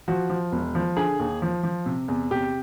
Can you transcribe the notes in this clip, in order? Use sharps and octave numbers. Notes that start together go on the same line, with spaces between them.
F3 F#4
F3
E1
F3
D3 G#4
D#2
F3
F3
C3
E2
C3 G4